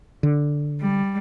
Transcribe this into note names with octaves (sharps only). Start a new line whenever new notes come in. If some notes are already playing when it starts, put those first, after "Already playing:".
D3
G3